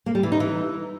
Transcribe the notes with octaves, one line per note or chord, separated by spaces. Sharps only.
A#3
G3
E3
D#4
E3